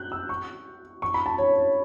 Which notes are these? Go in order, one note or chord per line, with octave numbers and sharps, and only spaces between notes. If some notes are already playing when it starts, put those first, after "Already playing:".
Already playing: F#6 G6
E6
C#6
C#6
B5
A5
C#5
C#5